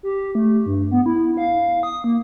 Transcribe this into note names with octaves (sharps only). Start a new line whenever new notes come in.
G4
A3
G2
B3
E4
F5
D#6
A#3